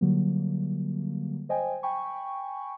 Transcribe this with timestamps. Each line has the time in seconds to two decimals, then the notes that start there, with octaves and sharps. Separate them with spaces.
0.01 D3 F#3 G3 A#3
1.49 C5 D#5 G5 G#5
1.83 G5 G#5 B5 C#6